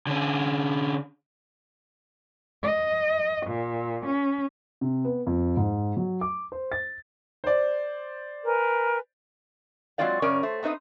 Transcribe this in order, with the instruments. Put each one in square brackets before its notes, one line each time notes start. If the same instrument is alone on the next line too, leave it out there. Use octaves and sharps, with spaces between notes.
[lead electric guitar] D3 C#4
[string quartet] D#5
A#2
C#4
[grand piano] C3
B3
F2
G#2
F#3
D6
C5
A6
C5 D5
[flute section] A#4 B4 G#5
[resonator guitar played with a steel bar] F#3 G#3 C4 F4 D5 F5
F#2 C#3 C#4 A#4 D5
A3 C5
B3 C4 D#4 C5 D#5